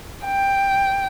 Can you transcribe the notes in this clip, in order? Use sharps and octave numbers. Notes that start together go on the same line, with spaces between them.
G5